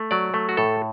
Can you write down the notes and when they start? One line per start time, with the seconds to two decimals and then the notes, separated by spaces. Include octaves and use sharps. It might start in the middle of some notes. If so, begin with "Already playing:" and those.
Already playing: A3
0.11 F#3 D5
0.34 A3
0.49 F#4
0.57 A2 A4